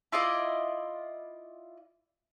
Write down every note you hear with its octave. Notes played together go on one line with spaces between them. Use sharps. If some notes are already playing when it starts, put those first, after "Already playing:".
E4 F4 D5 D#5